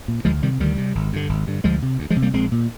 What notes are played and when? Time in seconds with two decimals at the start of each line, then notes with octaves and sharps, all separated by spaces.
0.08 A#2
0.25 D2 F3 G#3
0.43 C3 D#3 G3
0.60 D2 D#3 G3
0.78 C3
0.95 G#1
1.13 G2 D3
1.29 G#1
1.47 G2 D3
1.64 D2 F3 G#3
1.82 C3
1.99 D2
2.10 F3 G#3
2.16 C3
2.22 G3 A#3
2.34 A#1 G#3 C4
2.52 A#2